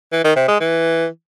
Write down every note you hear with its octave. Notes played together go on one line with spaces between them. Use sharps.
E3
D#3
C3
G#3
E3